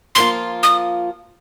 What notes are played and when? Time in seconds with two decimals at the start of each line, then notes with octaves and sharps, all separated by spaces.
0.15 F3 A#3 F4 C6
0.63 D#6